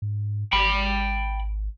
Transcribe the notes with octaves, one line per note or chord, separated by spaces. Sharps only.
G#2
G#1 G5 B5